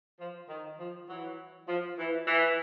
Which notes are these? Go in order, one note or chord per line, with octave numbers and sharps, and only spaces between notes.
F3
D#3
F3
E3 F#3
F3
E3
E3